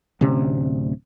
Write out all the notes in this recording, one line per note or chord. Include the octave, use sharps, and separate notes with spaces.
D1 D2 C3 C#4